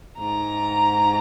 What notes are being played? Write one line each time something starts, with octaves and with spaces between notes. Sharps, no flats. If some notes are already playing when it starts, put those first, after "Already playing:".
G#2 A#5